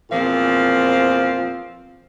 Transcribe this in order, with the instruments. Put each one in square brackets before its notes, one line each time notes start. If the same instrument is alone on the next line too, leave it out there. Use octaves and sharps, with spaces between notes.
[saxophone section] E2 A#2 F3 C4 F5